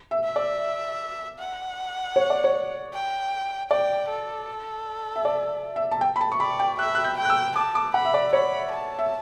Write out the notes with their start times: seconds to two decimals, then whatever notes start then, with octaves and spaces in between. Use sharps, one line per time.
0.11 E5
0.24 E5
0.36 D5
1.39 F#5
2.16 C#5
2.30 D5
2.44 C#5
2.93 G5
3.71 D5 G5
4.09 A4
5.16 E5
5.25 D5
5.76 E5
5.91 A5
6.01 G5
6.16 B5
6.21 A5
6.32 C#6
6.40 D5 B5
6.59 G5
6.79 E5 F#6
6.95 F#6
7.04 G6
7.17 G5
7.25 F#6
7.30 E6
7.56 A5 D6
7.75 D6
7.94 F#5 B5
8.05 E5
8.14 D5
8.33 C#5 B5
8.71 A5
8.99 E5